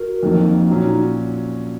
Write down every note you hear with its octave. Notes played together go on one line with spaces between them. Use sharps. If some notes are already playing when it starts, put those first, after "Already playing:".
Already playing: F#4 A#4
F2 D#3 F#3 A#3
A#2 F#3 C#4 D#4 F#4